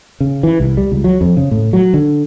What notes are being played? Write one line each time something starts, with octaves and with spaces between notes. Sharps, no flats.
C#3
E3
C2
G3
C#2
F#3
F2
C#3
A2
F#3
D3